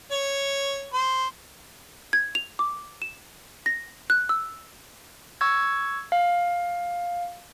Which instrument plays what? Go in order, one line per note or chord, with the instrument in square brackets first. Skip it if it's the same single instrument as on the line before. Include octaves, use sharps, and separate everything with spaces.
[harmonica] C#5
C5
[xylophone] G#6
F7
D6
E7
A#6
F#6
E6
[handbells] C#6 E6 G#6
F5